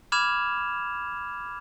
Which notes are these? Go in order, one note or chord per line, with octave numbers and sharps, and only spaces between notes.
B5 D6 F6 G#6 E7 F7